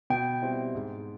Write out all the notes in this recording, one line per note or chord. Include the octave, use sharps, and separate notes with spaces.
B2 G5
G3 C4 E4
G#2